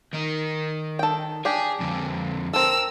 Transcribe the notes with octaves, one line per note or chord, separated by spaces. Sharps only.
D#3 D#4
A4 G5
D4 G4 G#4
F2 D3
C4 A4 A#4 E6